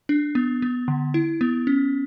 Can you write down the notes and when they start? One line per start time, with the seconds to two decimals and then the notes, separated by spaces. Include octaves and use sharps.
0.09 D4
0.35 B3
0.62 B3
0.88 D3
1.14 E4
1.41 B3
1.67 C#4